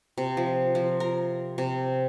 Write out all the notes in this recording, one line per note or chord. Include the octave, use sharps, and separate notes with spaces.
C3
F3
F3
A#4
C3